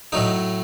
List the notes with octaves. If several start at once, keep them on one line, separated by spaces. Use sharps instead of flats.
A2 F#3 A3 D#4